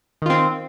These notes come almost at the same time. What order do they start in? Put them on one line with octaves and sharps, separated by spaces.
D#3 F4 C4